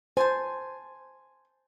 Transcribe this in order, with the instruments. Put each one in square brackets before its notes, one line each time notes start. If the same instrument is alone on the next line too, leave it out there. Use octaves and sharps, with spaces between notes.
[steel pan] C5 [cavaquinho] G#5 A5 C6